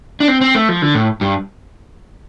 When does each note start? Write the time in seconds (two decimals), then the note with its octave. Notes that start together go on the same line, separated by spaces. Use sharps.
0.20 D4
0.28 C4
0.41 C4
0.55 A3
0.69 F3
0.82 D3
0.95 A2
1.21 G2